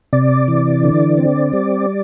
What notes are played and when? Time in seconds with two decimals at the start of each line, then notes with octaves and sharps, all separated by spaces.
0.13 C3 D5
0.48 E3
0.84 D3
1.18 C4
1.53 G3